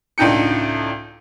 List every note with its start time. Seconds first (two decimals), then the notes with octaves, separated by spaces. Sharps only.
0.18 C#2 A2 D4 D#4 G5 C#7